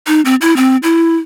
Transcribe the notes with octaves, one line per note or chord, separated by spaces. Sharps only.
D#4
C4
E4
C4
E4